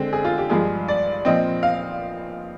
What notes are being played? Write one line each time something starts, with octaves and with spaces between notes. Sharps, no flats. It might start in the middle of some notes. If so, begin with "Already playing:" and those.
Already playing: D3 G#3 C4
G#4
F4
G4
G2 F3 G#3 G#4
D5
A#2 F3 C4 D#5
F5